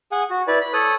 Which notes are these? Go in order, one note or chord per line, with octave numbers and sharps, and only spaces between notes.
G#4 F#5 G#5
F#4
E4 B4 D5
B5
A4 C#5 D#6 F#6